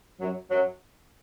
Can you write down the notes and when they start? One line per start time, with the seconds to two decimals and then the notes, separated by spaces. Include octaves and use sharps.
0.19 F#2 F#3
0.49 F#2 F#3